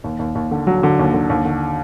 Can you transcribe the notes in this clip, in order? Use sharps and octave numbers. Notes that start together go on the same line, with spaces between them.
D#2
D#2
D#2
D3
F#3
D3
D#2
D3
D#2
D3